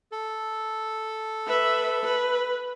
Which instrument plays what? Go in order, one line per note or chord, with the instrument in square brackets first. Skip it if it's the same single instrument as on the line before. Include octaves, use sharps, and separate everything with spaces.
[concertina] A4
[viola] B4 E5
B4